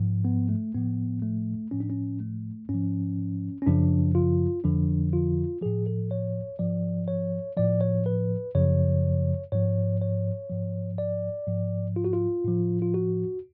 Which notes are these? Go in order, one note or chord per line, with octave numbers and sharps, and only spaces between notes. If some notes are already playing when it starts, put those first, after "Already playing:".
Already playing: G#2 F3
B3
A3
A2 F3 B3
A3
A2 F3 C#4
D4
C#4
A3
G#2 C#4
F3
C#4
F#2 C#3 F3 D4
F4
F2 D3 F3 D4
F4
A2 F3 G#4
A4
C#5
G#2 F3 D5
C#5
A2 F3 D5
C#5
B4
F#2 C#3 F3 C#5
G#2 F3 C#5
C#5
G#2 F3
D5
G#2 F3
F4
F#4
F4
A2 F3
F4
F#4